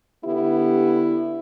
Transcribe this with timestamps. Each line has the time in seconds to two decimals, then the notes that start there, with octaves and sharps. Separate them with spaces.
0.25 D3 B3 E4 G4